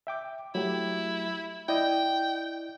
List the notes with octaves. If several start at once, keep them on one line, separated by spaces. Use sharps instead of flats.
E5 G5 D6
F#3 A3 E4 G4
E4 D5 D#5 G5